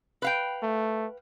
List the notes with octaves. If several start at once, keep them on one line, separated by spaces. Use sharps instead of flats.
B4 F5 G5
A3